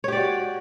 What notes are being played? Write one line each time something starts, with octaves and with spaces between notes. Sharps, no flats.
F#4 G4 C#5 D5